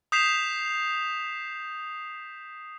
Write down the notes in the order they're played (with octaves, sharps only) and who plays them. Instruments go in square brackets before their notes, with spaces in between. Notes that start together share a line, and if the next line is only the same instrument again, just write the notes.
[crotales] D#6 G6 B6 C7 E7 F7